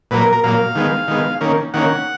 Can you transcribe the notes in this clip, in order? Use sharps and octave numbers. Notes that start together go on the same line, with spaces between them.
A#2 F#3 A#3 B4
A#4
A#4
A#2 F#3 A#3 F5
D#3 G#3 B3
D#3 G#3 B3
D#3 A#3 C#4
D#3 A#3 C#4 F#5